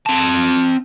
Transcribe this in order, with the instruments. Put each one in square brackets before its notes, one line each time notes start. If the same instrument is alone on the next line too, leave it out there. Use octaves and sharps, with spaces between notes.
[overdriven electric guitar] C4 A5